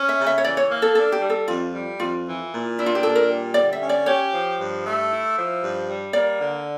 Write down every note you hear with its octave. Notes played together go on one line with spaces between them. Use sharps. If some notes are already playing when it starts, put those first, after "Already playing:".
Already playing: C#4
E5
C#3
E5
C#5
E3 D5
C#5
A#3
A4
D4 A4
G4
G3
A4
F2 F4
G3
F2 F4
E3
A#2
D4 E4
F4
G4
A#2 A4
A#4
G3
D3 D5
E5
C#4
D5
G4 C#5
F3
G2
A3
E4
F3
G2
G3
A#3 D5
D3